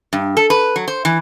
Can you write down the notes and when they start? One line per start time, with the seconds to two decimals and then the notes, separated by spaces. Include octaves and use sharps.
0.13 G2
0.37 A4
0.50 B4
0.76 F#3
0.88 C5
1.05 E3